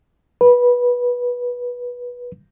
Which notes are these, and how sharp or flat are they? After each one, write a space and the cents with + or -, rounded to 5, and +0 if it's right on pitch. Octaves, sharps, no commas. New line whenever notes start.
B4 -15